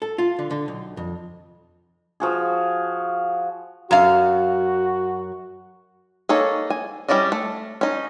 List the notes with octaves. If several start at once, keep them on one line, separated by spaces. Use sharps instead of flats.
A4
F4
D3
D3
B1
F2
F3 F#4 G#4
F#2 F#4 F5
A#3 D#4 G#4 A4 C#5
G#5
G3 C#4 E4 D5 D#5
A3
C#4 D#4